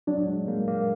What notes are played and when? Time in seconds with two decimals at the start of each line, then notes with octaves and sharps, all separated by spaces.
0.07 F#3 D4
0.28 G#3
0.47 G#3 A#3
0.68 A#3